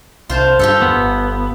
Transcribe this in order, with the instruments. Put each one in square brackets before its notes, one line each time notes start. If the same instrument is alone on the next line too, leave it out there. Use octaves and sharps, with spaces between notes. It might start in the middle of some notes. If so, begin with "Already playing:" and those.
[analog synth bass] C2 [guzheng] F4 C5 A5
[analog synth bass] G2 [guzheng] F4 G4 A4
[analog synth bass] E2 [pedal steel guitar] B3
[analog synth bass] G1